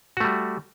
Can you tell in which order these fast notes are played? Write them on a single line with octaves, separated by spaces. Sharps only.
F#4 A3 G3